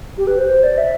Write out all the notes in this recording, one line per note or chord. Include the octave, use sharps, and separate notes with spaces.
G4
B4
C5
C5
D5
E5